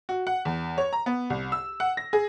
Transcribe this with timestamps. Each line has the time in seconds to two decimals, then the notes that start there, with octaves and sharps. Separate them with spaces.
0.09 F#4
0.27 F#5
0.45 E2
0.78 C#5
0.93 A#5
1.06 B3
1.30 C2
1.52 E6
1.80 F#5
1.97 A#6
2.13 G#4